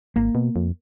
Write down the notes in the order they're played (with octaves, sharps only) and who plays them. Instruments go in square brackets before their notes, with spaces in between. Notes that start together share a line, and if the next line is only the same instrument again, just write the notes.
[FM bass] G#1 [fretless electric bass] A#3
[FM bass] B2
F2